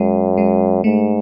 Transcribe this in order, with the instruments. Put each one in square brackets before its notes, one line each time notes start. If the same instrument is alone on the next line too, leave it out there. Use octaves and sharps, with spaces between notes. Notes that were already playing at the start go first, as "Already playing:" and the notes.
Already playing: [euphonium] F#2 [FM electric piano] G#3
[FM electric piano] G#3
[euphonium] G#2 [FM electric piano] A3